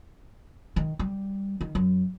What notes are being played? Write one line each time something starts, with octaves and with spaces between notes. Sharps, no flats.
D#3
G3
D#3
F#2